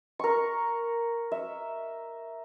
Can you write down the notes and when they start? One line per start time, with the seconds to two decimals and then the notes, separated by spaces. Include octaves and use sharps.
0.19 A#4 C#6
1.31 E5